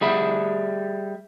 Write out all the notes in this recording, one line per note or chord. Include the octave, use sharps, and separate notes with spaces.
G3 G#4 E5 B5